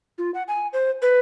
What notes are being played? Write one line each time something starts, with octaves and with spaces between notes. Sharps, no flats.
F4
F#5
G#5
C5
B4